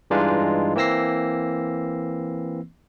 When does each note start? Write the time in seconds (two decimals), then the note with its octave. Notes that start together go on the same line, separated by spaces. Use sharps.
0.10 G2 E3 G#3 D4 D#4 F4
0.75 E3 A#3 C4 E6 A#6 C7